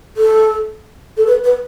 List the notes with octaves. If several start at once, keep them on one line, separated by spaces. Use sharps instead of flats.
A4
A4
B4
B4